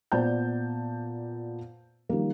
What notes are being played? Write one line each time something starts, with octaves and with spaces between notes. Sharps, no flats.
A#2 B3 C5 D5 A5 G6
D#3 F3 G3 A#3